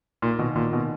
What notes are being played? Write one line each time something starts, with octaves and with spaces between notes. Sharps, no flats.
A#2 D#4
B2 D#3
A#2 D#3
B2 A#3